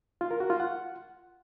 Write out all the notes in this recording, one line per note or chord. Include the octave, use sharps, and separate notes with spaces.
F4
A#4
F#4
F4
F#5